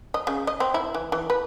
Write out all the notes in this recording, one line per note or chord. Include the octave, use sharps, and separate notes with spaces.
D#5
C#3
D#5
C4
E4
E3
E3
B4